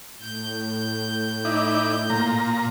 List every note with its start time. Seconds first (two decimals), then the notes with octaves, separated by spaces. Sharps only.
0.21 A2 G6
1.45 D#4 E4 D5
2.10 A#2 A#5